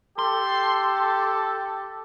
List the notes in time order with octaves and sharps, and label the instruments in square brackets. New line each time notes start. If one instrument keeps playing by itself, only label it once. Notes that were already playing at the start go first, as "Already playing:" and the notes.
[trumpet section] G4 A4 [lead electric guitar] C6